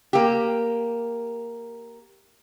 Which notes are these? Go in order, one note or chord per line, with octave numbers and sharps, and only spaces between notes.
A#3 G4